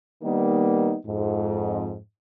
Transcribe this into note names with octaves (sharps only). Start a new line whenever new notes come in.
D#3 G3 A#3 B3 D#4
F2 G#2